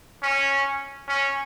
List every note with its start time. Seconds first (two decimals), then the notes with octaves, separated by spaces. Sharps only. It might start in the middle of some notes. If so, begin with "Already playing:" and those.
0.23 C#4
1.08 C#4